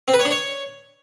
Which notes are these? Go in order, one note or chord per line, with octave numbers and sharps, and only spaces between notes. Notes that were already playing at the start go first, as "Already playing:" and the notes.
C4
B4
C#5
D4
C#5